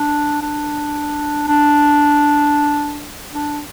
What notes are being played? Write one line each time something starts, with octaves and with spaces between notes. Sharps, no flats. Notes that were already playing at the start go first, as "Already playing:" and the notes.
Already playing: D4
D4
D4
D4